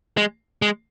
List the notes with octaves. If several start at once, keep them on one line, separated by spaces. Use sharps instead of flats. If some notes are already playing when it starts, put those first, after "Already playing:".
G#3
G#3